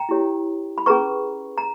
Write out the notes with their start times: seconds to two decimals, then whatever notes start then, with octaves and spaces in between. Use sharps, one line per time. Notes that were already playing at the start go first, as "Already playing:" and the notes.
Already playing: G5 A#5
0.09 E4 G4 C#5
0.78 B5
0.86 C#4 G#4 B4 A#5 C#6
1.58 A#5